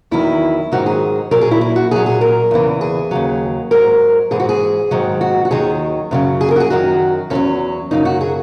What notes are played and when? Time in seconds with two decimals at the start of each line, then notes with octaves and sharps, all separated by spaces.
0.11 E2 D#3 F#3 E4
0.72 G#2 D#3 F#3 F#4
0.86 G#4
1.31 A#2 F#3 A#4
1.41 G#4
1.51 E4
1.61 E4
1.76 F#4
1.91 A#2 F#3 G#4
2.06 G#4
2.21 A#4
2.51 E2 C#3 E3
2.81 G#4
3.11 D#2 C#3 F#3
3.71 G#2 F#3 A#4
4.31 G#2 E3 G#4
4.40 F#4
4.49 G#4
4.91 G#2 D#3 F#3
5.21 F#4
5.45 F#4
5.51 D#2 D#3 F#3 G#4
6.11 F#2 C#3 F#3
6.41 G#4
6.51 A#4
6.56 F#4
6.60 G#4
6.70 F#2 D#3 F#3 F#4
7.30 E2 D#3 F#3 C#4
7.91 F#2 C#3 F#3 D#4
8.05 F#4
8.21 G#4